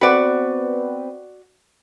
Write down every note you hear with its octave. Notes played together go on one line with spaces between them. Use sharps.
B3 C4 F#4 B4 D5